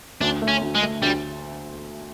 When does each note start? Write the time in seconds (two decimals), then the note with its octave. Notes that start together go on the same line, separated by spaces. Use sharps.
0.21 D2 D4
0.42 A3
0.48 C#4
0.61 D2
0.75 G#3
0.82 A3
1.03 D2 G3